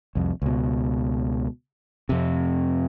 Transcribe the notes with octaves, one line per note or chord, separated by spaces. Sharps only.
C2 F2
C#2 B2
F2 C3